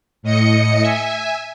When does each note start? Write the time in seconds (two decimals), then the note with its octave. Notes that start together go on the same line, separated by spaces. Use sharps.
0.23 A2 D#5 C#7
0.80 E5 G#5